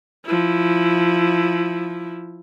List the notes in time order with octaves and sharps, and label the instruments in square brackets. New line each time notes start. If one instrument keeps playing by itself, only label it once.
[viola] F3 E4